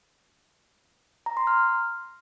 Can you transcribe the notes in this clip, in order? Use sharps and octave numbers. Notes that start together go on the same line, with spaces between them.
A#5
C6
F6